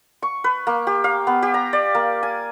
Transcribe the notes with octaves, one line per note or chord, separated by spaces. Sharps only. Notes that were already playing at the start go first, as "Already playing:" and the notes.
C#6
B4
A#3
G4
F5
B3
G4
A#5
D5
A#3
G#5